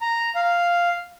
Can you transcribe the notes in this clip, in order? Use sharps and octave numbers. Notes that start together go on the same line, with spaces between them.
A#5
F5